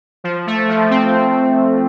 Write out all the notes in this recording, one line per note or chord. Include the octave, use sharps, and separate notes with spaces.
F3
A3
F3
C4